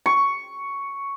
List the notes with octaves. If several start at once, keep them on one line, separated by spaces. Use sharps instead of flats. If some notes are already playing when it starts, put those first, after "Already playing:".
C#6